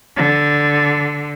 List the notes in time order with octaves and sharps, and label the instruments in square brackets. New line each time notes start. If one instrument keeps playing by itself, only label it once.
[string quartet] D3